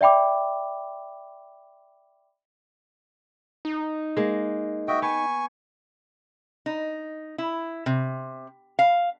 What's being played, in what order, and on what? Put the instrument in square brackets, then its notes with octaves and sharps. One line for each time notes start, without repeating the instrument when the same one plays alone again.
[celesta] D5 E5 G5 B5 D6
[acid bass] D#4
[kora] G#3 A#3
[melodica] F#4 D#5 E5 [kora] G5
[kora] B3 [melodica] G#5 C#6
[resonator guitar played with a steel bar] D#4
E4
C3
F5